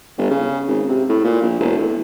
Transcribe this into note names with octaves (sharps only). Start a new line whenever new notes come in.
G1
C#3
G#1
C3
A2
A#2
A#1
E1
A2